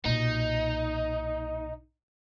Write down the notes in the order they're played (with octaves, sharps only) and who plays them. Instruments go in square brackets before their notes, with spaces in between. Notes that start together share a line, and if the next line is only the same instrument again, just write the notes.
[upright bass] B1 A#2 [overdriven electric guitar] D#4